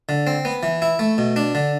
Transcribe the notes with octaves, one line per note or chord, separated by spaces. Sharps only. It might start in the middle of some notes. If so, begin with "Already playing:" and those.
D3
C4
B3
E3
E4
A3
B2
D4
D3